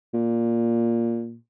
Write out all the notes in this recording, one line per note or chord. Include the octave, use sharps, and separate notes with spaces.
A#2